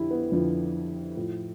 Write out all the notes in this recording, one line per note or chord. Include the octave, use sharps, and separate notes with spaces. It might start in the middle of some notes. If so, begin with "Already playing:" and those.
Already playing: F2 D3 E4 G4
B3
F2 D3 F3
A2 F3